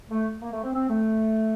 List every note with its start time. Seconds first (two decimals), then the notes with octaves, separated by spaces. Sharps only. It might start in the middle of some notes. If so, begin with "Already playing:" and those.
0.11 A3
0.42 A#3
0.53 A3
0.63 C4
0.74 C4
0.90 A3